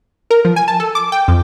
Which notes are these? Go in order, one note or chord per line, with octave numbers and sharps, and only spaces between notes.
A#4
F3
G#5
A5
A4
D6
G5
F2